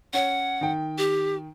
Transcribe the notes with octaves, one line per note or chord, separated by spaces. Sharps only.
C#4 C#5 F#5
D#3 G5
G4